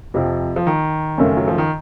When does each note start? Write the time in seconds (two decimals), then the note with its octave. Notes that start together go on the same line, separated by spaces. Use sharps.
0.14 F2 C3 F3
0.56 F3
0.67 D#3
1.18 F#2 C#3 A3 C#4
1.37 F#3
1.48 F3
1.58 D#3